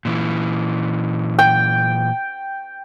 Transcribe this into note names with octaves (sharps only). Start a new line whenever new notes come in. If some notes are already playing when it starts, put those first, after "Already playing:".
A#2 E3
G5